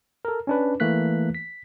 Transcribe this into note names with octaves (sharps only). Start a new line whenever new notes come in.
A4 A#4
C#4 D4 B4
E3 A3 A#3 F#6 B6
B6